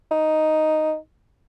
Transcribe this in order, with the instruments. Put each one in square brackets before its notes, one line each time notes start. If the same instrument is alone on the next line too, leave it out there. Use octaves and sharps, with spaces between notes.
[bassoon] D#4